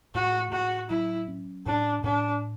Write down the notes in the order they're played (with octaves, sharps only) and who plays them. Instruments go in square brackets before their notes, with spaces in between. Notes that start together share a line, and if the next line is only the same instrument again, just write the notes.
[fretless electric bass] A2 [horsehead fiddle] F#4
[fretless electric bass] A2 [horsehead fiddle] F#4
[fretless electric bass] F#3 [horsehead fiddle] E4
[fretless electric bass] C#4
[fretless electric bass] A2 [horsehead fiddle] D4
[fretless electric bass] A2 [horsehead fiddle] D4